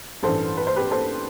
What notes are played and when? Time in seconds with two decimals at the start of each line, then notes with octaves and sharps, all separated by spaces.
0.23 A1 G2 E3 A4 C5
0.57 B4
0.67 C5
0.76 G4 B4
0.91 A4 C5